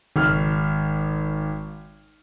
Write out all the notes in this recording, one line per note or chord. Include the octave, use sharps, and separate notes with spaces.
G#1 F6